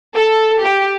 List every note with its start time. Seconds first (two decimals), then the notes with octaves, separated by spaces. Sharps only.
0.13 A4
0.60 G4